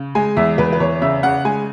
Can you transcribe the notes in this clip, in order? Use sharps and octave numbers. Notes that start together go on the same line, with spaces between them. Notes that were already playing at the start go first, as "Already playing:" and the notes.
Already playing: C#3
G#3 G#5
E2 E5
E2 B4
B4
E2 C#5
C#3 E5
C#3 F#5
G#3 G#5